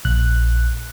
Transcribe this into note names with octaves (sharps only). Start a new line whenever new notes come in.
A#1 F#6